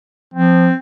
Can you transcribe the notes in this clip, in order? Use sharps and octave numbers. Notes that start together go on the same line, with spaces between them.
F3 C4